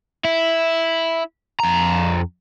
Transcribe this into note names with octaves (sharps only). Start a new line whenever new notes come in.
E4
F2 A#5